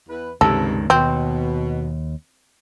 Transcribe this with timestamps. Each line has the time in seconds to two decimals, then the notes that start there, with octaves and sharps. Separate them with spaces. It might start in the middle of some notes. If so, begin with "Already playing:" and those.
0.08 E2 B4
0.41 C#2 G2 C3 D#3 A4
0.90 D#2 B2 C4